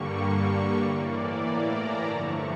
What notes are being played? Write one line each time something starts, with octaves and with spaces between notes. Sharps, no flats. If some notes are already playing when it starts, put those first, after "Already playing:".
Already playing: G2 D3 G3 A#3 C#6
A2 E3 A#3 D5
A#5
A5
G2 D3 F3 A3 C#6